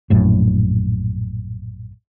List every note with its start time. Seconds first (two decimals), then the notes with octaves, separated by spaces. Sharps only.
0.10 A#1 F#2 A2